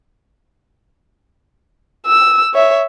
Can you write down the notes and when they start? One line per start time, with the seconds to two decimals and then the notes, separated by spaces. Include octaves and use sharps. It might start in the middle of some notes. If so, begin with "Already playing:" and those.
2.07 E6
2.53 C#5 E5